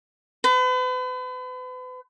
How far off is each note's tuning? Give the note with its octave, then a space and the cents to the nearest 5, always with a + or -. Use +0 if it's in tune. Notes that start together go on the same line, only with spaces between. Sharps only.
B4 +40